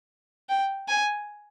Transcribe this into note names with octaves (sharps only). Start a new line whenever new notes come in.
G5
G#5